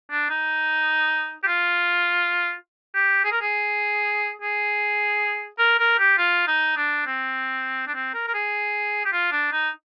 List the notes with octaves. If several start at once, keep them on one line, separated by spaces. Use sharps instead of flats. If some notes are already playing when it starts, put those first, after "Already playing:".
D4
D#4
G4
F4
G4
G#4
A#4
G#4
G#4
A#4
A#4
G4
F4
D#4
D4
C4
D4
C4
A#4
A#4
G#4
G4
F4
D4
D#4